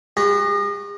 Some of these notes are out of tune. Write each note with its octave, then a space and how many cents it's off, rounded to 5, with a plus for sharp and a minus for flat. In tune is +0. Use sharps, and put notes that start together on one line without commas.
G#3 -45 F#4 +20